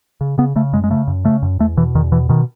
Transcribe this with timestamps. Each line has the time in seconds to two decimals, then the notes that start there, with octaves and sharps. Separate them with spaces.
0.21 C#3
0.38 C#3 B3
0.56 C#3 A3
0.73 F#2 G#3
0.84 G#3
0.90 C#3 A3
1.08 F#2
1.25 C#3 A3
1.43 F#2
1.59 E2 A3
1.77 B2 E3
1.95 E2 D#3
2.12 B2 E3
2.29 B2 D#3